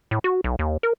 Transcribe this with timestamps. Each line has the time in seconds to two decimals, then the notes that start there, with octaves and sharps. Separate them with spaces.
0.11 A2
0.24 F#4
0.44 B1
0.59 D#2
0.83 A#4